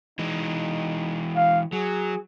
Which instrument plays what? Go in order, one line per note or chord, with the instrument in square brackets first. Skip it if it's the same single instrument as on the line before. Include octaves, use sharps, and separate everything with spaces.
[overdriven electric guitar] E3 G#3 [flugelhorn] D#4
[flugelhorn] F5
[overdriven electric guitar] F#3 [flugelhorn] G#4